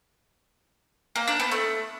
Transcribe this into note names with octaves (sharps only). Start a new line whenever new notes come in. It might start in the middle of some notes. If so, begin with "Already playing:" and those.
A#3
D4
B3
A3